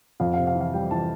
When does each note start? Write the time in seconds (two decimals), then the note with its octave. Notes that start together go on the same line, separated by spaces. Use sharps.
0.20 F2 F5
0.33 C3 F5
0.47 F5
0.55 E3
0.61 F5
0.73 G3 G5
0.91 E3 A5